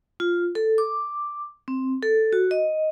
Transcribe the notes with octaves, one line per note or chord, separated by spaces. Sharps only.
F4
A4
D6
C4
A4
F#4
D#5